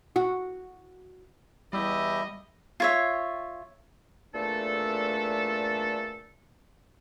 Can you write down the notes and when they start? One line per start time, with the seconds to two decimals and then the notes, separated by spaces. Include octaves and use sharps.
0.16 F#4
1.73 E2 G3 E4 G4 D#5 E5
2.80 F4 C#5 E5
4.35 E2 A#2 A3 D4 A4